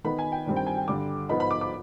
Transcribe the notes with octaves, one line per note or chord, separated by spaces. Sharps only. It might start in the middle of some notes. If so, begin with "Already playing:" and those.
D#3 B3 D#4 B5
G#5
G5
G2 D#3 G3 C4
G5
G#5
G5
G2 D3 G3 D6
G#2 F3 B3 D#4 B5
B5
D6
D6